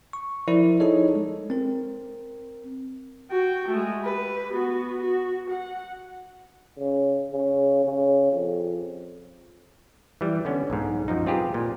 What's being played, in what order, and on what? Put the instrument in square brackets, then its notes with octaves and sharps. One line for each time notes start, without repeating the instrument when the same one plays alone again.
[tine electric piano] C#6
F3 E4 A#4 C5 D5
D#4 E4 G#4 A4 C#5 D#5
G#3
C4 A#4
[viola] F#4 G5
G#3 A3
G4 B4
B3 F#4
F#4
F#5
[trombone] C#3
C#3
C#3
F2
[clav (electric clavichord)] E3 G3
D3 B3 C#4
B1 G#2
F#2 F3 D#4
C4 F4 G4 G#4 B4
A#2